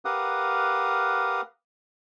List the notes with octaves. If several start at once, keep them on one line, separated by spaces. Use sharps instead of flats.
G4 A#4 B4 F5 F#5 D#6